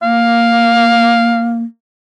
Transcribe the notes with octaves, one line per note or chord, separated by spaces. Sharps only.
A#3 F5